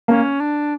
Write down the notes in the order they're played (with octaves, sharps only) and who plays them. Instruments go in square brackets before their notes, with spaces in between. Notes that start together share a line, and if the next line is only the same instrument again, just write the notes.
[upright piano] A#3 [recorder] C#4
[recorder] D4